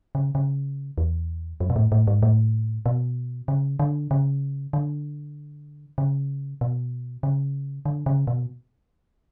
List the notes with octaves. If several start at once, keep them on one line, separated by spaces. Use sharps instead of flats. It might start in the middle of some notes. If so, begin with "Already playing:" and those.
C#3
C#3
E2
F#2
B2
A2
A2
G#2
A2
B2
C#3
D3
C#3
D3
C#3
B2
C#3
D3
C#3
B2